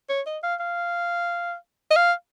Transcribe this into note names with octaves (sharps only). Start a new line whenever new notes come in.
C#5
D#5
F5
F5
D#5
F5